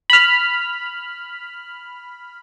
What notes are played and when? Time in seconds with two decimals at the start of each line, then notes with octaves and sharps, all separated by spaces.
0.10 B5 F6